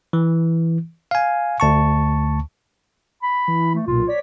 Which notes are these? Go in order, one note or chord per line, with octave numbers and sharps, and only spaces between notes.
E3
F5 G#5
D2 A5 C#6
B5
E3
A3
B1 A#2 F4
C#5 D5 B6